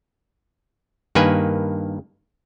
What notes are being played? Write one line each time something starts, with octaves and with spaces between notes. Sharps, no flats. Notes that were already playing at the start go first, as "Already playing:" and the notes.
G2 D#3 A#3 B4 G#5